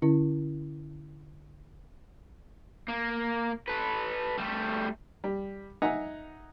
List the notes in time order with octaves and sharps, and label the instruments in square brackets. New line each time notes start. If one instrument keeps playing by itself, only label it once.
[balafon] D3 C#4 E4
[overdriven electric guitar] A#3
A4 B4
G3 A3
[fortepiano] G3
D#4 E5 F#5 G#5 A#5